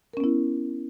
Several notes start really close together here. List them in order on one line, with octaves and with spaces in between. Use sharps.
A#4 C#4 B3 E4